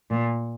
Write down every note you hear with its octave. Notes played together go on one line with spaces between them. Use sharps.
A#2